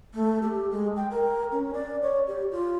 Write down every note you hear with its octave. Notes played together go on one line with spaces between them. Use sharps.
A3
G4
G#3
G5
A#4
C#4
D5
C#5
G4
F4